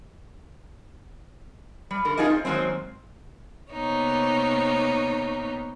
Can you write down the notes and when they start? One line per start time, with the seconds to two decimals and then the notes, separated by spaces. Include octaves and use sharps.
1.91 G3
2.05 D3 A#4
2.18 C#4 D#4 F4 G#4 A#4 D#5
2.30 C4
2.45 D#3 F#3 G#3 A#3 C4
3.72 C3 A#3 B3 D#4 C#5